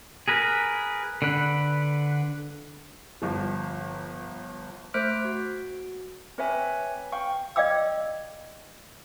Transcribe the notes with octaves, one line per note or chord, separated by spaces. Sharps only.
G#4 A#4 B4
D3 B4
G1 F3
A3 C5 F6 F#6 B6 D7
F#4
C4 B4 C#5 E5 G#5
F5 G5 C#6
D5 D#5 F5 G5 D6 E6